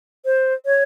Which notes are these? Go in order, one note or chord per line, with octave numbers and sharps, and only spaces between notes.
C5
C#5